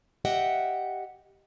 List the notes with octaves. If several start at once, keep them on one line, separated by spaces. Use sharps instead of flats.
G4 D#5 E5 F#5 G5